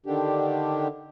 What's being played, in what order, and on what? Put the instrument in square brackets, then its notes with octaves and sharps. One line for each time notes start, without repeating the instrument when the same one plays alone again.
[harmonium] D3 D#3 D4 G4